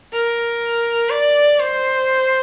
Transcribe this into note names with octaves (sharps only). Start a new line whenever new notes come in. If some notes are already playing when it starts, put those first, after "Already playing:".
A#4
D5
C5